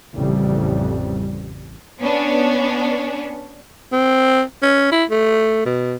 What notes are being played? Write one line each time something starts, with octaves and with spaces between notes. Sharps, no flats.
A1 F2 C#3 G3
B3 C#4 D4
C4
C#4
E4
A3
B2